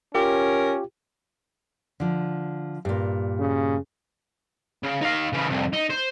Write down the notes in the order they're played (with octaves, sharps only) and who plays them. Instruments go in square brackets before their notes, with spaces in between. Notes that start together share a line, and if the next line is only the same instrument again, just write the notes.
[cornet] C#4 [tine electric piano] F4 G4 [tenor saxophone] A#4
[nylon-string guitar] D3 F3
G2 A#2
[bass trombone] C#3
[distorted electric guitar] C#3
D#4 F5
C#3 E3
C2 F2
D#4
C5